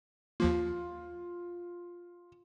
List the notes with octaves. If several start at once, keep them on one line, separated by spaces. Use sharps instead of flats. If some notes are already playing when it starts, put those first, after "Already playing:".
D#2 F3 A#3 F4